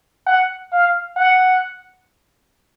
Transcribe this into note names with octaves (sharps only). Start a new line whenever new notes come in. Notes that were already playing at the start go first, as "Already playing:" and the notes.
F#5
F5
F#5